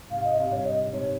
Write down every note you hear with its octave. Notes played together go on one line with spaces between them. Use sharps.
G#2 C3 F5
D#5
C3 F5
G2 A#2 C#5
D#5
G#2 C3 C#5